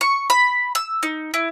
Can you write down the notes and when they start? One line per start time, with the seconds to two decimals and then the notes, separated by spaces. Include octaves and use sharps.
0.01 C#6
0.30 B5
0.75 E6
1.03 D#4
1.34 E4